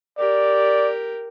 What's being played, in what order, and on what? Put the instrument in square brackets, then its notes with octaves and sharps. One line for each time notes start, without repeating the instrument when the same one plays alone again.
[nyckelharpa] G4 A#4 [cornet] D5